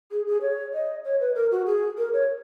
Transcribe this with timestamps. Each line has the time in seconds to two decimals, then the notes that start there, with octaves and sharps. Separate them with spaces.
0.11 G#4
0.27 G#4
0.41 C#5
0.73 D#5
1.05 C#5
1.20 B4
1.35 A#4
1.51 F#4
1.66 G#4
1.98 A#4
2.13 C#5